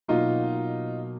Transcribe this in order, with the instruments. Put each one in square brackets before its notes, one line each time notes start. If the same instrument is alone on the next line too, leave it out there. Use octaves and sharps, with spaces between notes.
[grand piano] B2 F#3 A#3 D#4 F4